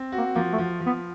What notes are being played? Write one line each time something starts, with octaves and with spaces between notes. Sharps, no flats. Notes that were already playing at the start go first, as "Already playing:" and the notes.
Already playing: C4
F#4
A#3
F3 A#3
A3
F3
F3
B3